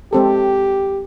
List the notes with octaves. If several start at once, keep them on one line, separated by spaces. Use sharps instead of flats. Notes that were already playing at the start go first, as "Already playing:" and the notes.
G#3 C4 G4 A4